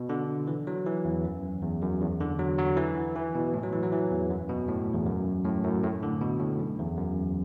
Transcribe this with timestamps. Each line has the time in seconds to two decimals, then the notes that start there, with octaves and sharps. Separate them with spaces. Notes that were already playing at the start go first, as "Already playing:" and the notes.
Already playing: B2
0.09 D3
0.47 E3
0.67 F#3
0.86 E3
1.05 E2
1.24 F#2
1.62 E2
1.82 F#2
2.01 E2
2.20 D3
2.39 F#3
2.58 F#3
2.77 E3
3.15 E3
3.35 B2
3.54 A2
3.63 F#3
3.72 E3
3.83 F#3
3.92 E3
4.11 E2
4.30 F#2
4.49 B2
4.68 A2
4.94 E2
5.06 F#2
5.45 A2
5.64 F#2
5.83 A2
6.03 D3
6.21 B2
6.40 A2
6.60 F#2
6.79 E2
6.98 F#2